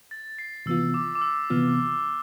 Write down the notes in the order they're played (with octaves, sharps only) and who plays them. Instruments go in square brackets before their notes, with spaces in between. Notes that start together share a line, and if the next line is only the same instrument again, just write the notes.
[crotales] A6
C7
[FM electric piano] C3 E3 B3 F4 [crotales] E6
[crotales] D6
D6
E6
[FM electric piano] C3 E3 B3 F4 [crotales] F6